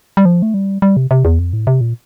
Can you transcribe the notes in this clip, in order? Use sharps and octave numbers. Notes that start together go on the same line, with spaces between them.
G3
F3
A3
G3
G3
C3
C3
E2
F2
A2
C3
A#2